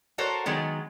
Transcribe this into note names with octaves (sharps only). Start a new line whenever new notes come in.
F#4 A4 A#4 C5 C#5
D#3 F#3 G#3 B3